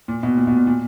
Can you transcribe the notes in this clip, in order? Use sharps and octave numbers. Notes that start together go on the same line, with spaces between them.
A#2
B2
A#2
B2
A#2
A#2